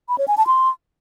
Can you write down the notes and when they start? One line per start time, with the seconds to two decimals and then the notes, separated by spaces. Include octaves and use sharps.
0.09 B5
0.18 C#5
0.28 G#5
0.37 A5
0.47 C6